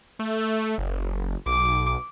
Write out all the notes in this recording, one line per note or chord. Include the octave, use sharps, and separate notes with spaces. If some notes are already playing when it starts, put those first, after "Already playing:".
A3
F#1
B1 D6